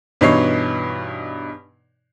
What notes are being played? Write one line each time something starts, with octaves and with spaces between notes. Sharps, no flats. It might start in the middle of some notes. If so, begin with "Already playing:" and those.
G2 B2 E3 D#4 C#5 C7